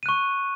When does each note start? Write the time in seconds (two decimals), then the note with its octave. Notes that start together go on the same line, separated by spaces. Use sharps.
0.03 D#7
0.06 F#6
0.09 C#6